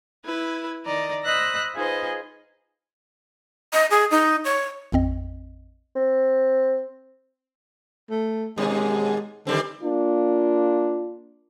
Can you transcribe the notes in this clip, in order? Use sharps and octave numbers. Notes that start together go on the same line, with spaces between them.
E4 B4 G#6
D#3 D5 D#5 A#5
C5 D#5 B5 E6 F#6 A#6
D#4 F4 G#4 B4 C5 D#5
D#5
G#4
D#4
C#5
A1 F2 C4 D#5
C4
A3
D#2 G#2 B2 G#3
D3 D#3 G3 C4
A#3 D4 F4